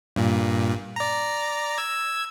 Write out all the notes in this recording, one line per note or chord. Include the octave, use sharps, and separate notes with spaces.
G2 A#2
D5 A#5
E6 G#6